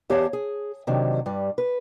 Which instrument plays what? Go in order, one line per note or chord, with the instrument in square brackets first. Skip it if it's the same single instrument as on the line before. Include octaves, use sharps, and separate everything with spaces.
[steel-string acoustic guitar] E2 G4 C#5 D#5 F5 A5
G#4
C3 D#3 F#3 D4
G2 G3
B4